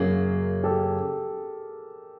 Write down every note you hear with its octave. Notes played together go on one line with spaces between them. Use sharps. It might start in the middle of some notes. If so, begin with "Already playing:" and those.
Already playing: F#2 C#3 F#3 A#3 G#4 A#4
G4 A4